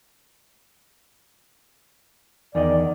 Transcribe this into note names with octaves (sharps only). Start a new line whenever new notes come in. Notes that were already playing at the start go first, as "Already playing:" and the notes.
E2 D#3 D5 D#5